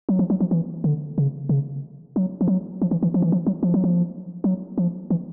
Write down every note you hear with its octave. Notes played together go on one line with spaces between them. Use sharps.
F#3
F3
F#3
F3
E3
D3
C#3
C#3
F#3
F3
F#3
F3
E3
E3
F3
E3
F3
F#3
F3
F#3
F3
F#3
F3
E3